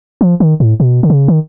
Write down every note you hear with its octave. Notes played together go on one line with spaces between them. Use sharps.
F3
D#3
A2
B2
D3
C#3
D#3